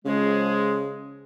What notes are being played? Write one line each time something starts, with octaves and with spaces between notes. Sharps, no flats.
C#3 F3 G#3 G#4